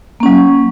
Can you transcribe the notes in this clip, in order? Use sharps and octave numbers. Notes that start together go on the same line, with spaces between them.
F#3 A#3 C#4